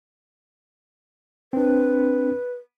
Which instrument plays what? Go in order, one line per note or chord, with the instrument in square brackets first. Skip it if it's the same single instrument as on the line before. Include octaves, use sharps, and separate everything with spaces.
[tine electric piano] C4 D4 [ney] B4